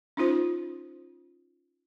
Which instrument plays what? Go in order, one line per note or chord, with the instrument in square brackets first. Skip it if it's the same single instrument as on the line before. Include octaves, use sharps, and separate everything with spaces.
[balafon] C#4 D#4 F4 C5